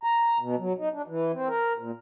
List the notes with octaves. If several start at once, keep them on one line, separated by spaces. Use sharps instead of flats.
A#5
B2
F#3
D#4
D4
E3
C4
A#4
A#2